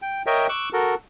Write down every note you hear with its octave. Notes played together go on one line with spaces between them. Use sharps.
G5
A#4 C#5 D#5 E5 G5
C#6 D6 E6 F#6
F#4 A4 A#4